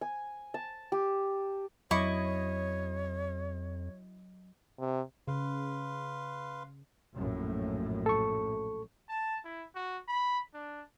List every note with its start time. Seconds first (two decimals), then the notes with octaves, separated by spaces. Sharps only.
0.01 G#5
0.54 A5
0.92 G4
1.91 F2 F#3 E4 C#5 D#5 C#6
4.79 C3
5.28 C#3 B4 F5 C6
7.13 A#1 F#2 A2
8.06 A4 C#6
9.09 A5
9.45 E4
9.75 F#4
10.08 B5
10.54 D4